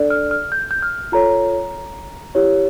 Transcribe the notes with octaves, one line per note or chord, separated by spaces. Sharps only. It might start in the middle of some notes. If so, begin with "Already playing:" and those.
Already playing: D4 A4 D5
F6
F6
G6
G6
F6
F4 A4 C#5 A#5
E4 G4 C#5